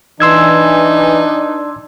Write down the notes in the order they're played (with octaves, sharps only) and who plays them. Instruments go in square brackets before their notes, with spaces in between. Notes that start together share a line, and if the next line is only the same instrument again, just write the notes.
[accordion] E3 [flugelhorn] D4 [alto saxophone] D#4 [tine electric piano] C6 E6 G#6